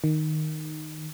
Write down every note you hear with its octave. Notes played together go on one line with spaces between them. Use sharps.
D#3